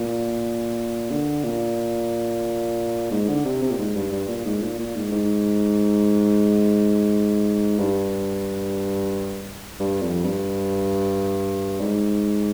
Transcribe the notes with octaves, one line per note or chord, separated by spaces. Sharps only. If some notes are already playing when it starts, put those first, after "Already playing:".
Already playing: A#2
D3
A#2
G#2
D3
C3
C3
A#2
G#2
G2
G2
A#2
G#2
A#2
A#2
G#2
G#2
G2
G2
F2
G2
G#2